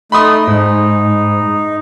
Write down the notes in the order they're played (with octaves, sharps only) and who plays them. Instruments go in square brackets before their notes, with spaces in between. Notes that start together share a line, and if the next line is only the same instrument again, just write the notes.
[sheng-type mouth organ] A3 D#4 [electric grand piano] B5 C6 D#6
[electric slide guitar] G#2 [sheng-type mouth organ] D#4